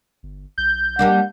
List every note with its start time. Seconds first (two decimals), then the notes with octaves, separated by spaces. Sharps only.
0.23 G1
0.58 B1 G6
0.99 G3 A#3 D4 F#5